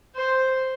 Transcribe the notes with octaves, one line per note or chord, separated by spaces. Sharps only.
C5